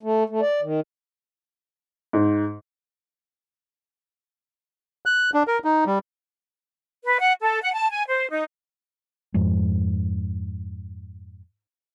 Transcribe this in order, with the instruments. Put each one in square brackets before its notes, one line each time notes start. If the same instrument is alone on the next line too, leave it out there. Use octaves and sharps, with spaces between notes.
[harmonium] A3
A3
D5
D#3
[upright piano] G#2
[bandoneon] F#6
D4
A#4
D#4
G3
[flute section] B4
F#5
A4
F#5
A5
G#5
C5
D#4
[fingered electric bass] F2 G#2